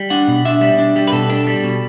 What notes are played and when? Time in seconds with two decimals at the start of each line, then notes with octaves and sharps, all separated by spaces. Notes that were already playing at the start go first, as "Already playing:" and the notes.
Already playing: G3
0.10 D4 F#5
0.28 B2
0.45 D4 E5
0.61 G3
0.79 D4
0.96 G3
1.07 B4
1.12 B2 A4
1.30 D4
1.47 G3
1.64 B2